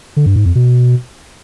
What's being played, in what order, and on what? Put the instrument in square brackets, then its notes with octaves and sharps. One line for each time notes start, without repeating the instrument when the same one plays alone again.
[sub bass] D3
G2
G#2
F2
B2